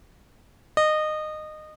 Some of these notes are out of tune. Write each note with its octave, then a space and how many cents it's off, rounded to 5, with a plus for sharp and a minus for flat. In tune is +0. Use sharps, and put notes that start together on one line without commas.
D#5 -20